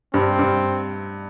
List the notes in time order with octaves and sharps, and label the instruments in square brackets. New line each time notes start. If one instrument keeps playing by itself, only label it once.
[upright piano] G2 [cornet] C4
[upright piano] G2